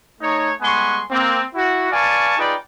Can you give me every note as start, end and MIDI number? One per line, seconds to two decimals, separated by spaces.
0.21 0.51 57
0.21 0.51 63
0.21 0.51 73
0.62 1.02 55
0.62 1.02 56
0.62 1.02 59
0.62 1.02 80
0.62 1.02 84
0.62 1.02 85
1.11 1.41 58
1.11 1.41 60
1.55 1.88 64
1.55 1.88 66
1.92 2.35 71
1.92 2.35 74
1.92 2.35 77
1.92 2.35 80
1.92 2.35 81
1.92 2.35 85
2.37 2.55 63
2.37 2.55 65
2.37 2.55 68
2.37 2.55 71
2.37 2.55 74
2.37 2.55 79